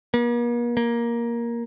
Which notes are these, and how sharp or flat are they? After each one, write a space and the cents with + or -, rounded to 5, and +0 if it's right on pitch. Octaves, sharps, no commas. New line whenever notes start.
A#3 +45
A#3 +10